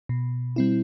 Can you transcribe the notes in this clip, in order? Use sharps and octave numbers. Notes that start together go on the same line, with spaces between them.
B2
G3 C4 E4